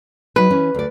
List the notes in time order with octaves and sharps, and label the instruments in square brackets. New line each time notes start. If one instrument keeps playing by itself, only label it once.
[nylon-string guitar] F#3 D#4 [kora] B4
[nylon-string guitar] E3 C#4
D2 D5